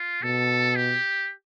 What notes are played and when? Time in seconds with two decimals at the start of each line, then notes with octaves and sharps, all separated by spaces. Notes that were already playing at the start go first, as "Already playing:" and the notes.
Already playing: F4
0.23 B2 A4
0.75 G4